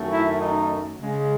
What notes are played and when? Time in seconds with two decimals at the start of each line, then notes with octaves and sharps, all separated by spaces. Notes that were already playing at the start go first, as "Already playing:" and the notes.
Already playing: F#2 D#3 A3
0.11 E4
0.40 D#4
0.98 C#3 G#3